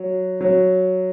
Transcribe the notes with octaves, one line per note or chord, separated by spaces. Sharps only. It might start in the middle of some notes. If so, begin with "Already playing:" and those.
Already playing: F#3
F#3